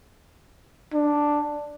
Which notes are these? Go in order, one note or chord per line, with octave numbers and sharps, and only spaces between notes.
D4